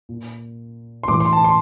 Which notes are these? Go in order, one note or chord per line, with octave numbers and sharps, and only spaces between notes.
A#2
C6
A2 E3 D6
C6
A5
C6